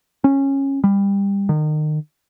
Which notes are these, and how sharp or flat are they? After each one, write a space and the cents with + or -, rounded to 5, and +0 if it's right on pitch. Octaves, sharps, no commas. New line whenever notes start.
C#4 -15
G3 +20
D#3 -30